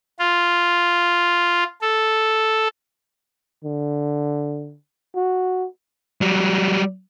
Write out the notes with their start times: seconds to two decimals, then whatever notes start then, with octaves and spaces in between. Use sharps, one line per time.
0.19 F4
1.81 A4
3.65 D3
5.15 F#4
6.21 F#3 G3